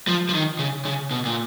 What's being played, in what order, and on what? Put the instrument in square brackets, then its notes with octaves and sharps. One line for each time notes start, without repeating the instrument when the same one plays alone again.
[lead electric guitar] F3
F3
D#3
C#3
C#3
B2
A#2